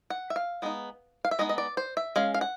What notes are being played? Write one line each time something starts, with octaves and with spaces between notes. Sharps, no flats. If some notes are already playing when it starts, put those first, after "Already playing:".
F#5
E5
F5
G#3 B3 D#4
F5
E5
G#3 B3 D#4 D#5
D#5
D5
C5
E5
G#3 C#4 F5
F5
F#5